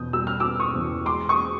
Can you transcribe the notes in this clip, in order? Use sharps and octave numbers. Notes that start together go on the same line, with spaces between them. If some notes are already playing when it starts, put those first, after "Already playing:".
Already playing: E2 B2 B3 D#6 G6
G3 E6
F6
B3 D6 E6
C#6 D#6
E2
G#3 C6 D6
C#6 D#6